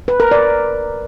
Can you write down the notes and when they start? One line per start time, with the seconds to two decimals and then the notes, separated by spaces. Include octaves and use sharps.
0.08 B4
0.20 A#4
0.31 D5